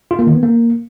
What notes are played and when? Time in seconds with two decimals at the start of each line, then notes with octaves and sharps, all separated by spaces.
0.11 F4
0.19 A#3
0.27 D#3
0.35 B3
0.43 A#3